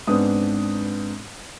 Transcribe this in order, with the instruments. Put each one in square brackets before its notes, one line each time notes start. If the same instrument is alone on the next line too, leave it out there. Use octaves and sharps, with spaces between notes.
[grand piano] G#2 B3 C4 D4 D#6